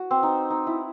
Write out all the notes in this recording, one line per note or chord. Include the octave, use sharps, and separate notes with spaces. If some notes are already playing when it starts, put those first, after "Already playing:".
Already playing: F#4
C4
D#4
D#4
E4